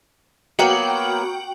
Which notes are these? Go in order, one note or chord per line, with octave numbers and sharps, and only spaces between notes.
F#3 A#3 B3 F#4 G5 F#7